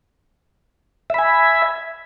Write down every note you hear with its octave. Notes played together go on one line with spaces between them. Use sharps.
E5 G#5 B5